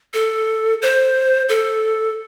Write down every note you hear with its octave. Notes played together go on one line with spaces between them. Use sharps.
A4
C5
A4